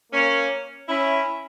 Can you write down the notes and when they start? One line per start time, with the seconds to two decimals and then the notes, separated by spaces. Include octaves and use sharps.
0.12 A#3 C#4
0.87 C#4 E4